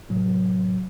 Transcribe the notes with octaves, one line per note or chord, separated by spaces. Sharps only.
A2 C3 F#3